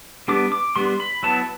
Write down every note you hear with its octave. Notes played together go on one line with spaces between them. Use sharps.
G3 B3 D4 D6
D6
G3 B3 D4 C6
B5
F#3 B3 E4 A5